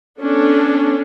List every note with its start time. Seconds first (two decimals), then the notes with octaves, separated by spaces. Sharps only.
0.19 B3 C#4 D4 A4